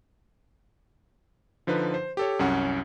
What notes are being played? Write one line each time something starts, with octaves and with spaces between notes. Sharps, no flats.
D3 F3 D#4 B4
C5
G4 A4 C#5
C2 F#2 C#4 F#5